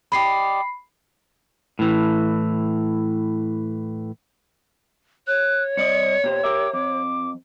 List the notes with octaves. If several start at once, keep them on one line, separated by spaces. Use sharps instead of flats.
G4 D5 D#5 B5 C7
A2 E3
C#5 F#6
C2 D5 D#5 C#7
A#2 G4 C5
G4 A#4 E5 D6
F2 D6